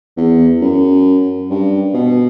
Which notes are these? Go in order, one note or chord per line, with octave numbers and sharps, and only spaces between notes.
E2
F#2
G2
B2